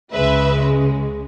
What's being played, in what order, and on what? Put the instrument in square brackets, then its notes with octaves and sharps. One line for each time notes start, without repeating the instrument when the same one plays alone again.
[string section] C#2 C#3 G#3 B4 E5